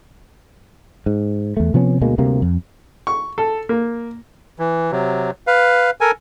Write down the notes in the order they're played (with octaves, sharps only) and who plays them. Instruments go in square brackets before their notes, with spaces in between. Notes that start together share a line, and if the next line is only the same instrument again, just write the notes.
[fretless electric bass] G#2
E2 A3
C3 F3 B3 C#4
D2 B2 G#3 A#3
D2 C3 G3 A#3
F2
[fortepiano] C#6
A4
A#3
[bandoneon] E3
C3 F#3
B4 F5
A4 A#4 G#5